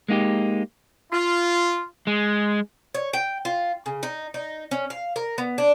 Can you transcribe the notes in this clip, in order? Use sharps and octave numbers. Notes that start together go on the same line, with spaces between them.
G#3 A#3 D#4 F#4 G4
F4
G#3
C#5
G5
F4
C#3
D#4
D#4
C#4
F5
A#4
B3
D4